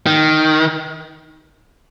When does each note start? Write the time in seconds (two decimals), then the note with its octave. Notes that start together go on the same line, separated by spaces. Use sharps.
0.06 D#3